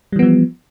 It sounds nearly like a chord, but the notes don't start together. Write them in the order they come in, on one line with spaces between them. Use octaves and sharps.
G3 E3 B3 F3